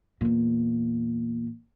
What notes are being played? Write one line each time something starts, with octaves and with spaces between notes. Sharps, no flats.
E2 A#2